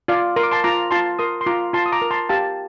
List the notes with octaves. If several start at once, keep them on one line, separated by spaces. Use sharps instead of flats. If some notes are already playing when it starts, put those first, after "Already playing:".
F4 D5 F5
A#4 C6
D6
A5 C6
F4 A#5 D6
F4 A5 C6
A#4 C6 D#6
C6
F4 A#5 D6
F4 A5 C6
D#6
A#5 D6
A#4
A5 C6
G4 F5 A5